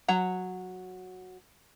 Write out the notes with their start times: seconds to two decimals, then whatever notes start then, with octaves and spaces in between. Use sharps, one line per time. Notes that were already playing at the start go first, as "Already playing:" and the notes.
0.08 F#3 F#5 A#5